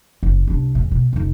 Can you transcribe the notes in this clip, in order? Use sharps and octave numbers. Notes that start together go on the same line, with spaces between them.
F#1
C2 D4
E2 A2
B2
F1 D#4